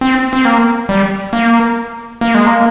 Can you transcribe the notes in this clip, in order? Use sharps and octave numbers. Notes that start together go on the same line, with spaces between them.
C4
C4
A#3
G3
A#3
A#3
G#3
A#3